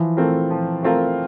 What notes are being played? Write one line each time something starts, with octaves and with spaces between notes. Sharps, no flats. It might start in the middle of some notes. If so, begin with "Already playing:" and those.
Already playing: E3 F3
A3 C4 F4 A#4
F3
A3 C4 F4 A#4